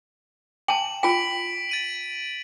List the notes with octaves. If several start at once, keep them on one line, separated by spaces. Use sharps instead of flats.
G5 A5 E7 F#7
F4 G5 B6 D7
A6 D#7 F#7